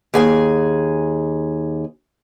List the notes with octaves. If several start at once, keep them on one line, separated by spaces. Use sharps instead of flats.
D#2 G#4 G#5